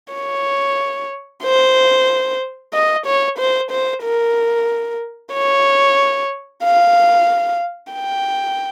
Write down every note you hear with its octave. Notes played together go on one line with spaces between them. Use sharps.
C#5
C5
D#5
C#5
C5
C5
A#4
C#5
F5
G5